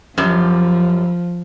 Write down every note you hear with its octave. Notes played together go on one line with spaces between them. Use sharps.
F#2 F3 G3